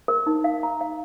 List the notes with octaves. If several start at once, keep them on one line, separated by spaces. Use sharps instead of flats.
A#4
D#4
F5
A#5
F5